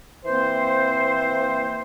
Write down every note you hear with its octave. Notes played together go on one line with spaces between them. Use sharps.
E3 A#3 C4 C5